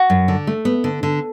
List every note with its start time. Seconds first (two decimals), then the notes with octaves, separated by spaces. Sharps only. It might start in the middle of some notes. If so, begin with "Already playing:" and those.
Already playing: F#4
0.10 F#2
0.28 D3
0.47 A3
0.65 B3
0.84 D3
1.03 D3